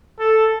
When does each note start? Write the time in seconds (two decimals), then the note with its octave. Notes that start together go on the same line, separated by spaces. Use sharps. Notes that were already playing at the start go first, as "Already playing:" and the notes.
0.19 A4